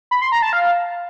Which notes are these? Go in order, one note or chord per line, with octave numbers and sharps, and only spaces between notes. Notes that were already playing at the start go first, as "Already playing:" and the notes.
B5
C6
A#5
A5
F5